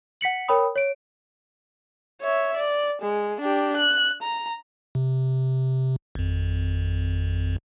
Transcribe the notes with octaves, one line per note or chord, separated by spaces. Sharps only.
F#5 B6 C#7 F#7
A#4 C#5 G5 B5 D#6
C#5 D7
C#5 E5
D5
G#3
D4 G4
F#6
A#5
C3
G#1 F2